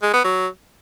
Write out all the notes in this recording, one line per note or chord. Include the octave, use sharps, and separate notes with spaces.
G#3
B3
F#3